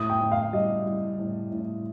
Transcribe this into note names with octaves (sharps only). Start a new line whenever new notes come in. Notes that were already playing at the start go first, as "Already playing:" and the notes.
Already playing: A2 D#6
G5
A2
F5
G3 D#5
G3
A2
A2